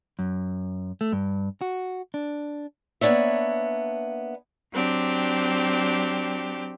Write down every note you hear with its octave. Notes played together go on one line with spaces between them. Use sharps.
F#2
A3
G2
F#4
D4
A#3 B3 D4 C#5 E5
F#3 C4 D4 G4